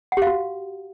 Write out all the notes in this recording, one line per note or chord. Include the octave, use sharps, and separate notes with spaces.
F#4 G4 F5 F#5